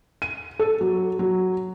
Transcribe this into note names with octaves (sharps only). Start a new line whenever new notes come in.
D#7
A4
F#3
F#3